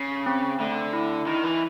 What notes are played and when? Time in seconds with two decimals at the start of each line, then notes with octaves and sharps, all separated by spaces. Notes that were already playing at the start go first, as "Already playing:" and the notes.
Already playing: C#3
0.26 C4
0.60 D3 A3
0.93 E4
1.27 D#3 E4
1.44 E3